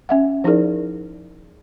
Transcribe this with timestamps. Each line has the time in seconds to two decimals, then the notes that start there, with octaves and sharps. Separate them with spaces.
0.09 C#4 E5 F#5
0.44 F3 D#4 E4 G#4 A#4 D5